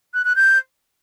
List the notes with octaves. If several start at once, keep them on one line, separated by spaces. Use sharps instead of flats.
F#6
F#6
G6